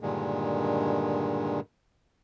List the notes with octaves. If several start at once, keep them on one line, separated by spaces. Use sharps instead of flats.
G2 A#2 D3 D#3 G#3